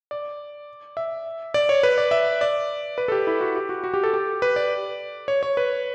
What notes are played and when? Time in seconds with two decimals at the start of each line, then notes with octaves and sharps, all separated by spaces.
0.11 D5
0.97 E5
1.54 D5
1.69 C#5
1.83 B4
1.98 D5
2.11 E5
2.41 D5
2.98 B4
3.08 A4
3.12 G4
3.27 E4
3.41 F#4
3.55 G4
3.69 F#4
3.84 F#4
3.94 G4
4.03 A4
4.14 G4
4.42 B4
4.56 D5
5.28 C#5
5.43 C#5
5.57 B4